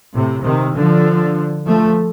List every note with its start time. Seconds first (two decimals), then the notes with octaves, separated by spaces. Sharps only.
0.14 A2 C3
0.44 C3 D#3
0.74 D3 F3
1.65 F3 A3